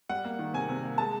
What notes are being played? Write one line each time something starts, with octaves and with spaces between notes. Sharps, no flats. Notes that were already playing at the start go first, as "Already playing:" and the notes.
G3 F#5
A#3
D#3
C3 G#5
C3
A#3
G#3 A5